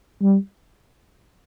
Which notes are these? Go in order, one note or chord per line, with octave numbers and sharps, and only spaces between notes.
G3